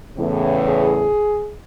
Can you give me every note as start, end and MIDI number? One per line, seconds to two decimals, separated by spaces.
0.17 1.09 40
0.17 1.09 45
0.17 1.09 49
0.67 1.54 68